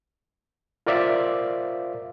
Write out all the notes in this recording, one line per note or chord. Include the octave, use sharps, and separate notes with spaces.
F4 A#4 C5 D5 E5 F5